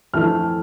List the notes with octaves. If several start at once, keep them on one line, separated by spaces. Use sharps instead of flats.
F2 E3 A3 E4 F6